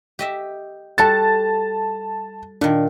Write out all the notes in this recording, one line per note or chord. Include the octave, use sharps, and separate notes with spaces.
G4 D#5 E5
G3 F#4 A4 A5 A6
A#2 D#3 D4